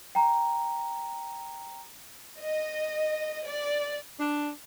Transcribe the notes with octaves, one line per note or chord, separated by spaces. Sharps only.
G5 A#5
D#5
D5
D4